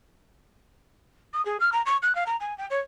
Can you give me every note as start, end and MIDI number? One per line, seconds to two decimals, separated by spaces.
1.33 1.44 87
1.45 1.57 68
1.60 1.70 89
1.72 1.82 82
1.86 1.97 85
2.02 2.15 90
2.15 2.24 77
2.26 2.36 82
2.40 2.56 80
2.58 2.66 79
2.70 2.79 73